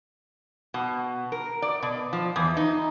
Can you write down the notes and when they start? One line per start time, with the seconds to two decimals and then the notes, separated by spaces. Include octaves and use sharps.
0.74 B2
1.32 A#4
1.62 D5
1.82 B2
2.13 F3
2.36 E2
2.57 D#4